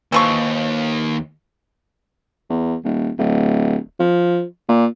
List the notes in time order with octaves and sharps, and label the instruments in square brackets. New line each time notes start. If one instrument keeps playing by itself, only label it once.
[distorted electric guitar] D#2 [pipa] E3 F3 C#6
[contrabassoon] E2
D#1
D1
F3
A#2